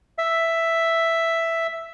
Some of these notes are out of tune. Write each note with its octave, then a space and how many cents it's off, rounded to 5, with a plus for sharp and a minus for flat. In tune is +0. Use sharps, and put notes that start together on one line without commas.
E5 +5